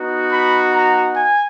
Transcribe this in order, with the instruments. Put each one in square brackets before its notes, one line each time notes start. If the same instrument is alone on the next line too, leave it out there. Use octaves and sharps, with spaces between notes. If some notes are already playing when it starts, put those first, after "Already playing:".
Already playing: [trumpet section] B3 D#4 F#4
B5
A#5
G#5